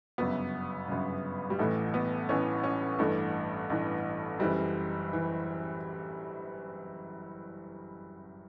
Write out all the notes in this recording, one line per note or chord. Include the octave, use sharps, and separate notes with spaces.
G1 F#2 C#3 B3
G1 F#2 C#3
G3
A1 A2 E3 A3
B3
A1 A2 E3 C#4
C#4
A1 G2 E3 A3
A1 G2 E3
F#1 F#2 E3 G3
E3